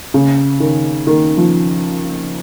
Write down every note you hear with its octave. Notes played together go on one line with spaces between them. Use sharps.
C#3
D#3
D#3
F3